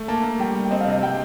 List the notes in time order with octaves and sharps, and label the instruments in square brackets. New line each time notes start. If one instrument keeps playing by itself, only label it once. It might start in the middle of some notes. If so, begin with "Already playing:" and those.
Already playing: [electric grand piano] A3
[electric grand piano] A#3 [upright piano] A5
[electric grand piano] A#3
[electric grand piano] G3 [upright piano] G5
[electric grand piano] G3
[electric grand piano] C4 [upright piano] D#5
[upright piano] F5
[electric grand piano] C3 [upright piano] D#5
[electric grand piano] G3 [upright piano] G5